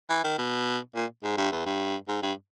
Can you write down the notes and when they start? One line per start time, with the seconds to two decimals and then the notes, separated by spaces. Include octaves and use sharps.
0.09 E3
0.24 D#3
0.38 B2
0.95 A#2
1.24 G#2
1.37 G2
1.52 E2
1.66 G2
2.08 G#2
2.23 G2